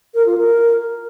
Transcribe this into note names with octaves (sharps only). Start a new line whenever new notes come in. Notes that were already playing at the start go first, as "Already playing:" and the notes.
A#4
F4
A#4